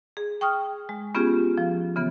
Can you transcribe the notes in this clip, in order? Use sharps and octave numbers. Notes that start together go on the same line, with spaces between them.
G#4
G5 C#6 D#6 F6
G#3
B3 C#4 F4 G4 G#4
F3
C#3 E3 B3